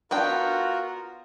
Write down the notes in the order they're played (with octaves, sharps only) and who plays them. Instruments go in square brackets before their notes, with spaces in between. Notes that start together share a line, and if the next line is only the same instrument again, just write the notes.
[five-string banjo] B3 D4 G5 [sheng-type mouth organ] F4 F#4 A#4